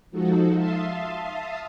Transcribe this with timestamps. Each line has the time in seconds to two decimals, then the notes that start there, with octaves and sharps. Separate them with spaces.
0.11 F3 G#3 D#4 F#4 A4
0.55 E5 F5 A5 C6 D#6